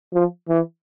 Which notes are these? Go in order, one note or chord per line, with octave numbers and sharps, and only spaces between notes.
F3
E3